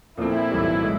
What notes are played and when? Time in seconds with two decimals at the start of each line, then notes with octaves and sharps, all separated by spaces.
0.17 A#2 F3 A3 C4 E4
0.51 B1 A2 E3 G3
0.84 G#3